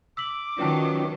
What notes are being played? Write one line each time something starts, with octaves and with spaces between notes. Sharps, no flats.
D6 E6 B6 F#7
D#3 F#3 C#4 F4 B4 D5 G5 A5